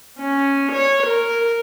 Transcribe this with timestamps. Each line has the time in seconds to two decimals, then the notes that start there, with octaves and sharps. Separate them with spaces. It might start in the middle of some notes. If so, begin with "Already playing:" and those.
0.19 C#4
0.72 C#5
1.07 A#4